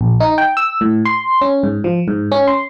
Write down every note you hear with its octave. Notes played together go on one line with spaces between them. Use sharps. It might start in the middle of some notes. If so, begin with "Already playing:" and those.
A#1
D#4
G5
E6
A2
C6
C#4
G#2
F3
G#2
C#4
C6